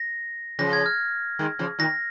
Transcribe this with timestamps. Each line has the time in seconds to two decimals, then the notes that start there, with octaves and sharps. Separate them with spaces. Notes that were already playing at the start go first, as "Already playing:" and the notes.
Already playing: A#6
0.59 C#3 F3 A#6
0.73 G#6
0.86 F6
1.39 D#3 G#3
1.59 C#3 F3
1.79 A#2 D#3 A#6